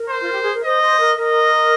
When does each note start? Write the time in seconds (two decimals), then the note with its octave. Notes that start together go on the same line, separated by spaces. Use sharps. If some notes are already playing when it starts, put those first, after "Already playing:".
Already playing: A#4
0.09 C5
0.22 F4
0.32 G4
0.43 G#4
0.53 A#4
0.63 C5 D#5
0.81 C5
0.99 A#4
1.16 A#4 D#5